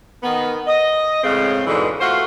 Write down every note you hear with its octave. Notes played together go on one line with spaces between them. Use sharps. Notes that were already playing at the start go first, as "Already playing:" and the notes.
D#3 B3
D#5
A2 C#3 G#3 C4
G#2 B2 D3 E3
A3 F4 F#4 C5